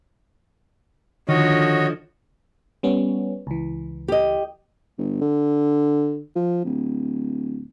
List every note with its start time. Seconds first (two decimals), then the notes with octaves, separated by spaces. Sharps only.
1.29 D3 D#3 F3 F#4 C#5 D#5
2.83 G3 B3 C#4
3.47 C#2 E3
4.08 G4 D#5
4.98 G1
5.21 D3
6.36 F3
6.65 D1